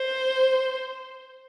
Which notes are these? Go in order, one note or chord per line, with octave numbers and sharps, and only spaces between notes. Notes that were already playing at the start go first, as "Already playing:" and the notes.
Already playing: C5